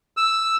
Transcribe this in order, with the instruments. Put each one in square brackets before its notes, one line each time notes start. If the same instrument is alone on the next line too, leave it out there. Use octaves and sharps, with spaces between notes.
[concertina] E6